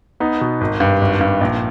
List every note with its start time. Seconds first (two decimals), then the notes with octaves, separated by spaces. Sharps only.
0.20 B3 D#4
0.41 B2
0.61 G#1
0.80 G2
1.01 G#1
1.21 G2
1.41 A#1